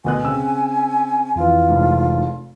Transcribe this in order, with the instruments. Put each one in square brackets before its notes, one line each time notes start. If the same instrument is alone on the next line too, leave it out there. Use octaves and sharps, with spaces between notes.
[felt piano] D2 B2 F#6 [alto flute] G#5
[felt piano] C#3 E6 [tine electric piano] C4
[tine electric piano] F2 E3 [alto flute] F4
[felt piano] F1 G#2